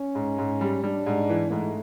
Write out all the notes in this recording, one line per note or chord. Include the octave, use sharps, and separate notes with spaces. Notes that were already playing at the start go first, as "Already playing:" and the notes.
Already playing: C#4
G#2
G#2
G3
G3 D4
G#2
E3
G#2 A3